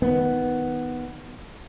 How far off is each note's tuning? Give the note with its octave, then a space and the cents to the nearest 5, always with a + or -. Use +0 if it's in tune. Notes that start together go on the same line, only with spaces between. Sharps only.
D#3 +0 B3 +0